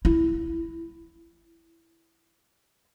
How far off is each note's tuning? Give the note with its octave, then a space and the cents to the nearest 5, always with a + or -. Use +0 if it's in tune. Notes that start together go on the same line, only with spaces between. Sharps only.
E4 +10